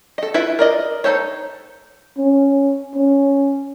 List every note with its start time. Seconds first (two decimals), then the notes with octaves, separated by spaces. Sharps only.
0.18 A4 D#5
0.34 E4 F4 B4 E5
0.59 A#4 D5 D#5
1.04 D#4 E4 A4 C5 C#5
2.18 C#4
2.95 C#4